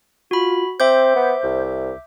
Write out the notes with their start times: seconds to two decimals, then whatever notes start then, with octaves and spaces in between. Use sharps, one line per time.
0.31 F4 F#4 B5
0.80 C4 C5 E5 D6 G6
1.16 B3
1.43 C2